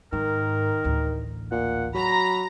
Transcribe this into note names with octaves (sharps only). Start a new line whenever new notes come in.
G#2 D#3 A#4
A1 D2
A#2 F#5
F#3 A#5 B5